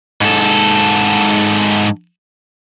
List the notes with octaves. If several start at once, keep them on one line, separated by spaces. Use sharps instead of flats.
G#2 A4